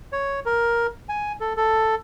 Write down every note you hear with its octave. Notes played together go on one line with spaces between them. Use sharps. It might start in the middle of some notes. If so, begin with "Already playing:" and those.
C#5
A#4
G#5
A4
A4